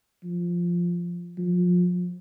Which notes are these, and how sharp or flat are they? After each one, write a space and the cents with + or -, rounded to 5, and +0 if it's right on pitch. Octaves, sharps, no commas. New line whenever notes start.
F3 +0
F3 +30